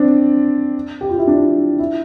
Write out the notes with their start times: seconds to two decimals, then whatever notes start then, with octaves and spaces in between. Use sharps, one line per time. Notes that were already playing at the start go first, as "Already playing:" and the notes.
Already playing: C4 D4
1.01 G4
1.10 F4
1.18 E4
1.27 D4
1.79 E4